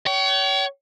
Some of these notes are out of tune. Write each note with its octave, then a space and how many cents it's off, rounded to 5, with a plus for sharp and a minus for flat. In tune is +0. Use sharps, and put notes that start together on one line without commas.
C#5 +25 G5 -40